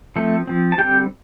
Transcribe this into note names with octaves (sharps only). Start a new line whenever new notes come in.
F3 A3 C4 A4
F3 C4
A5
D3 G3 C4 G4 G5